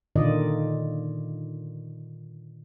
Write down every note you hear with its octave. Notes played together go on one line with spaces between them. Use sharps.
A#2 D3 D#3 F4 D5 D#5